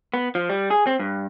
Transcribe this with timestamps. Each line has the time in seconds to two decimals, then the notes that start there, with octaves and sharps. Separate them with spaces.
0.14 B3
0.35 F3
0.50 G3
0.71 G#4
0.87 C4
0.99 G2